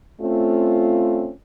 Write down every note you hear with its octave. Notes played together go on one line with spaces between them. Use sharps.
A3 C4 C#4 F4